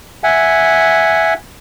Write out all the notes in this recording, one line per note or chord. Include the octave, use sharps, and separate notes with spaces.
E5 F#5 G#5